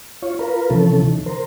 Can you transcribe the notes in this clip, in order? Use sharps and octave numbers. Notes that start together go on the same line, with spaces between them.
F4 C#5
F4 A#4 B4
C3 E3 F3 C#4 A4
D#3 E3
A#4 C5